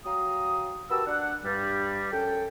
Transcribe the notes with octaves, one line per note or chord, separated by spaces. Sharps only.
F#3 F5 G5 A#5 D#6
F#4 G4 A#4 B4 A5 E6
D4 F#5
G2 G3
F#2 A4 G5